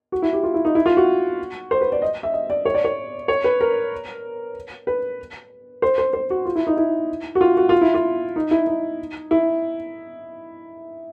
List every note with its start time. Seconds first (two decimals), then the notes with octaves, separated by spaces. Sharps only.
0.12 F#4
0.22 E4
0.33 G4
0.43 F4
0.54 E4
0.65 D#4
0.75 E4
0.86 F4
0.97 F#4
1.71 C5
1.81 B4
1.92 D5
2.02 D#5
2.23 E5
2.33 D#5
2.50 D5
2.65 C#5
2.74 D5
2.84 C#5
3.28 C#5
3.44 B4
3.61 A#4
4.87 B4
5.82 C5
5.98 C5
6.13 C5
6.30 F#4
6.45 F4
6.56 E4
6.67 D#4
6.77 E4
7.35 F#4
7.41 F4
7.57 F#4
7.69 F4
7.81 E4
7.94 F4
8.36 D#4
8.51 E4
8.67 D#4
9.31 E4